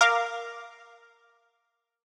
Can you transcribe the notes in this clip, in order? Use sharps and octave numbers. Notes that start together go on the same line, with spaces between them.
A#4 F5 D6